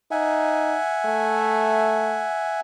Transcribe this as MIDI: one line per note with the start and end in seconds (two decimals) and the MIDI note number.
0.11 0.77 63
0.11 2.60 76
0.11 2.60 78
0.11 2.60 80
1.05 2.27 57